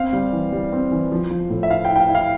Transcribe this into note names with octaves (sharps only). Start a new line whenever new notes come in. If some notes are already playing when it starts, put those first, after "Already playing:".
Already playing: C4 F5
G3
E3
G3
C4
E3
F3
F3
A2
E5
E4 F5
G5
E4
G5
F5
E4
F5